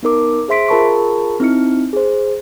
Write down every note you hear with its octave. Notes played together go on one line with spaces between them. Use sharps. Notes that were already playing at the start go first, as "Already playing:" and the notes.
B3 D#4 A#4 D6
G#4 C5 E5 C6 B6 D7
F4 G#4 A#4 A5 B5 C#6
C4 D#4 E4 F6 C#7
G#4 C5